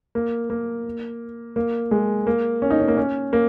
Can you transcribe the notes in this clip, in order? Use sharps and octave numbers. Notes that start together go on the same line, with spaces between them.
A#3
A#3
A#3
G#3
A#3
C#4
D#4
C#4
A#3
C#4
A#3